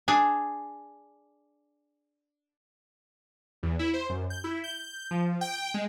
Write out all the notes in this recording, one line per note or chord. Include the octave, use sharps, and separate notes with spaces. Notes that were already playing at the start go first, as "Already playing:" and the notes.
D4 G#4
E2
E4
C5
F#2
G6
E4
G6
F3
G5
G#3